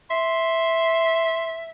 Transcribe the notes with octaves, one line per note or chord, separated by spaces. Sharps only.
E5 C6